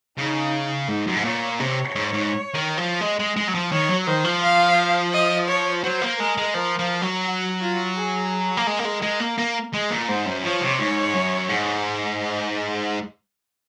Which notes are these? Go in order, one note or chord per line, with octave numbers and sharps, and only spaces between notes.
C#3 D#4
G#2 D#4
F#2
G#2
A#2 C#5
C3 C#5
G#2
G#2
D#3
F3
G#3
G#3
G#3
F#3
F3
D#3 C#5
F#3
D#3 C5
F3
F5
D#5
C#5
F#3 C5
A#3
G#3 A#4
G#3
F3 A#4
F3
F#3
F#4
F4
G#4
A#3
G#3 A#4
A#3
G#3
G#3
A#3
A#3
G#3
A#2
G#2 C5
F#2
F3 C#5
C3
G#2
F#2
G#2